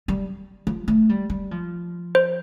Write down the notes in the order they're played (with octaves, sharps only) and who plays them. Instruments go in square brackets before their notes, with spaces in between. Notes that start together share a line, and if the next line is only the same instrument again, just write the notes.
[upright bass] G3
F3
A3
G3
G3
F3
[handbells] C5